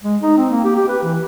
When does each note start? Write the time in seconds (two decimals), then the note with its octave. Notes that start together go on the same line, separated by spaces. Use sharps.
0.03 G#3
0.22 D#4
0.37 C4
0.51 A#3
0.64 G4
0.76 G4
0.89 B4
1.03 E3